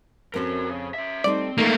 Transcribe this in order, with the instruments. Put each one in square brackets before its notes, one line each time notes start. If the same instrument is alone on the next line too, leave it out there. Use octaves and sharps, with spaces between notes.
[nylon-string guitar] F2 C4 C#4 [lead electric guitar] F#4 A#4
[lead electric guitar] C#3
C#4 E5
[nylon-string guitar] G3 A3 D#4 [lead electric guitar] C4 [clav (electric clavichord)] D5
[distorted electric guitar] A3 A#3 [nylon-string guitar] D#4